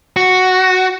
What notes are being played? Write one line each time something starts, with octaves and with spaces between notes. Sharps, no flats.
F#4